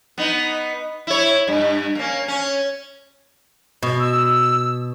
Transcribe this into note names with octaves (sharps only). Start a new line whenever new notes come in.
B3 D#4
E4 C#5
G2
A#3 C#4
C#4
B2
E6